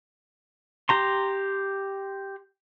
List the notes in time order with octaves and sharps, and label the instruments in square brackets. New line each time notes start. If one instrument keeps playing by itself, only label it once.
[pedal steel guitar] G4 A#5 C6